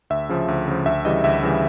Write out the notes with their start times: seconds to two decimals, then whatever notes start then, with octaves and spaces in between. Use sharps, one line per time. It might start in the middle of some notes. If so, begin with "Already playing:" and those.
0.10 D2 E5
0.29 C#3 F3
0.48 D2
0.68 C#3 F3
0.86 D2 E5
1.05 C#3 E3 G3 D#5
1.24 D2 E5
1.43 C#3 E3 G3